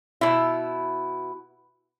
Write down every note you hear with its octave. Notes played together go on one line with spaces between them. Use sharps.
B2 E4